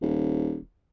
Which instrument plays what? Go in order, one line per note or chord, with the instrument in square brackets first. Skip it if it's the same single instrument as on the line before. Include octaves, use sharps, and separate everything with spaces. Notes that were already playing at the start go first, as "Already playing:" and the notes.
[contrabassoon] D#1